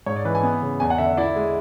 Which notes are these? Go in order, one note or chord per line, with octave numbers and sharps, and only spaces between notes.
G#2 C#5
D5
E3 B4
G#5
B3
C#3
E2 G#5
F#5
D3 E5
E4 D5
G#3